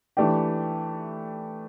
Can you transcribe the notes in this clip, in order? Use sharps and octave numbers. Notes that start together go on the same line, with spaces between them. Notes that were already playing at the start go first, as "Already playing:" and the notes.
E3 A3 D4 G4